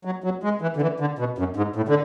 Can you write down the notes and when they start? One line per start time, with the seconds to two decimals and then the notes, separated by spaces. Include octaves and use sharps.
0.05 F#3
0.24 F#3
0.43 G#3
0.61 E3
0.77 D3
0.82 E3
1.00 D3
1.19 B2
1.38 F#2
1.56 G#2
1.76 A2
1.89 D3